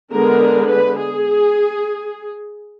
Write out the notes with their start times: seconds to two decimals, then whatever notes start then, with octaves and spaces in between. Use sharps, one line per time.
0.11 D3 G#3 B3 A#4
0.69 B4
0.97 G#4